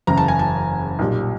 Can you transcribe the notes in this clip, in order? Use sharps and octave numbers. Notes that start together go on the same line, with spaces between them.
F#1 E2 C#3 A#5
A5
G#5
A5
B1 A#2 G3